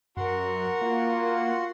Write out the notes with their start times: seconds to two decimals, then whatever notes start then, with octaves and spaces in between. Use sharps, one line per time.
0.17 F#2 F#4 A#4 F#5 C6
0.81 A#3 F4